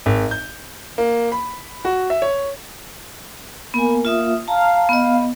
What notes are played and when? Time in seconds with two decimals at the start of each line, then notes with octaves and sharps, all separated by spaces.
0.06 G#1
0.31 G6
0.98 A#3
1.32 B5
1.85 F#4
2.10 E5
2.22 C#5
3.74 A#3 B3 G#5
4.05 F4 E5 D#6
4.48 F5 A5 A#5
4.89 B3 D#5